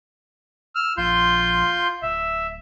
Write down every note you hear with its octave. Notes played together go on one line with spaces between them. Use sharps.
E6 F6
A#1 F4 C6 G6
D1 E5